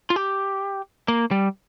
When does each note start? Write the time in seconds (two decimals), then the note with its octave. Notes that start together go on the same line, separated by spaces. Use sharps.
0.10 F4
0.16 G4
1.08 A#3
1.31 G3